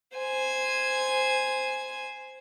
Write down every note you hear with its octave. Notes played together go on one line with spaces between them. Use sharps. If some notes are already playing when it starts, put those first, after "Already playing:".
C5 G#5